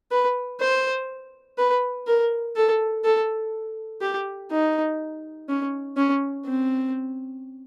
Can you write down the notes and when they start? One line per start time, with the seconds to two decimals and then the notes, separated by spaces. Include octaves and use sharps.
0.11 B4
0.60 C5
1.58 B4
2.07 A#4
2.55 A4
3.04 A4
4.01 G4
4.51 D#4
5.49 C#4
5.97 C#4
6.46 C4